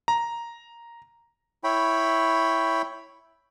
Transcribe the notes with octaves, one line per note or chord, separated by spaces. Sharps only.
A#5
E4 C#5 G5 B5